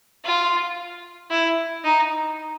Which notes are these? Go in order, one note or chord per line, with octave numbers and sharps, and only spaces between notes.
F4
E4
D#4